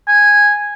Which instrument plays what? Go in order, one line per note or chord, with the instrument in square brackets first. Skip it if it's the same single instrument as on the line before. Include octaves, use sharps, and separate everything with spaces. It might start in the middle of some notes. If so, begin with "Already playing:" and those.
[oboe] G#5